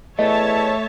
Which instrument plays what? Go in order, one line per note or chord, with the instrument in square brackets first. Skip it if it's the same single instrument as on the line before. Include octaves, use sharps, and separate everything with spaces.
[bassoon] E2 [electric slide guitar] A3 [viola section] C#5 E5 A5 [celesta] D#5